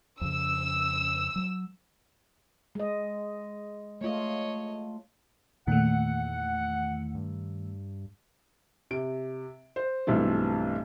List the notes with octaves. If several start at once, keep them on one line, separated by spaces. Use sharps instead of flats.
F2 C#3 E6
F#3
G#3 D#5
A3 F4 C#5 D#5
E2 A#2 D#3 A3 F#5
G2
C3 D7
C5
B1 G2 E3 A3 C4